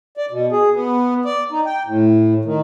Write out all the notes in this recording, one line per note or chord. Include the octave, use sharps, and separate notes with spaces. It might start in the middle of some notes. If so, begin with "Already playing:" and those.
D5
B2
G#4
B3
D5
D#4
G5
A2
D#3